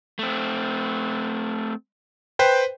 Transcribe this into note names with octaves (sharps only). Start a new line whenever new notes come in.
A3 C4
B4 C5 G5